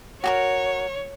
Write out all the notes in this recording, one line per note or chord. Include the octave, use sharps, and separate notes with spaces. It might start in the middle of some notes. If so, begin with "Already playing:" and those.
F#4 G4 A#4 C#5